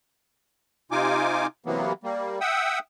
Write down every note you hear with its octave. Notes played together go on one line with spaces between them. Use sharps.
C3 D#4 F4 G#5 D6
C3 E3 F#3 A#3 B3
G3 A#3
E5 F#5 G5 D#6 E6